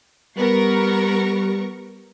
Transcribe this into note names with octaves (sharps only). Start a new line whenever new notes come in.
G3 B3 A#4 C#6